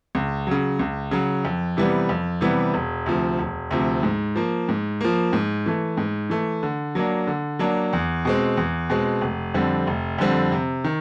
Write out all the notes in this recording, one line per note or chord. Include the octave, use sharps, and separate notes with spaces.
C#2
C#3 F#3
C#2
C#3 F#3
F2
C3 E3 G3 B3
F2
C3 E3 G3 B3
E1
D2 C3 F3
E1
D2 C3 F3
G#2
F3 A#3
G#2
F3 A#3
G#2
E3 A3
G#2
E3 A3
D3
F#3 A#3 D4
D3
F#3 A#3 D4
E2
B2 G#3 C4
E2
B2 G#3 C4
F1
F2 D3 G3 C4
F1
F2 D3 G3 C4
C3
D#3